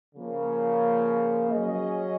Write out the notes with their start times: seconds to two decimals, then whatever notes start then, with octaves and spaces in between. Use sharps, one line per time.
0.15 C#3 F3 A#3
1.52 F#3 C#4 G#4 D#5